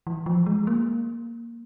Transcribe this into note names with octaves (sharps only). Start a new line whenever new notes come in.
E3
F3
G#3
A#3